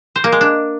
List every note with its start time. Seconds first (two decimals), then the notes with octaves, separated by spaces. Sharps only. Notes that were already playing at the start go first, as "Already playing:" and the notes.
0.16 C5
0.24 A#3
0.32 G#3
0.41 D4